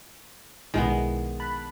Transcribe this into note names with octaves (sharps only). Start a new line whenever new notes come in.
B1 D#3 G#3 B3 E4 G#4
A5 B5 F#6